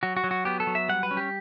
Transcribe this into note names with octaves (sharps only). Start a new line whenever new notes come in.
F#3 F#4
F#4
F#3
F#4
B3 G4
A4
F#3
E5
G3 F#5
B4
C#4
G4